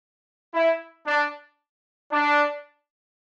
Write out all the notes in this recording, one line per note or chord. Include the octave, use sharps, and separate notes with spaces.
E4
D4
D4